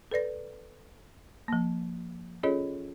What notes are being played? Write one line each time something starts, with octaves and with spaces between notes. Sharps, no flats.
A4 B4 D5 A#6
F3 A#3
C#4 F4 G#4 A4 C#5 D#5